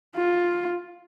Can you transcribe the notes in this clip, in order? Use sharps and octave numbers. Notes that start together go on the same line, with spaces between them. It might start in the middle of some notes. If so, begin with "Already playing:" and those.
F4